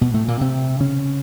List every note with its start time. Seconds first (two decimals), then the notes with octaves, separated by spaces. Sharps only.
0.01 B2 B3
0.14 A2 A3
0.28 A#2 A#3
0.41 C3 C4
0.80 C#3 C#4